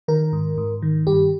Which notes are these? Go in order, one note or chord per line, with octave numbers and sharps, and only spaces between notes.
D#3 A#4
G#2
G#2
D#3
G2 G4